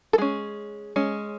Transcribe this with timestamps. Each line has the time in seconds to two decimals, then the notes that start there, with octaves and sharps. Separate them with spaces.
0.13 A4
0.18 G#3 C#4 G#4
0.96 G#3 C#4